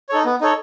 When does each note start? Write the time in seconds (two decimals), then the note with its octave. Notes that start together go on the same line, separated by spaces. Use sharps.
0.09 D#4 A4 C#5
0.25 B3
0.41 D#4 A4 C#5